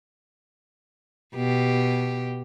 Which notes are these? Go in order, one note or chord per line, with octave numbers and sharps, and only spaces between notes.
B2 G4